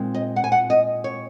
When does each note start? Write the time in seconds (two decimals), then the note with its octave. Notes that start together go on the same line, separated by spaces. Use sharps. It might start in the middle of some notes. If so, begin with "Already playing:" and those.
Already playing: A#2 G#3 C4 D#4
0.14 D#5
0.36 F#5
0.44 G#5
0.52 F#5
0.70 D#5
1.04 C#5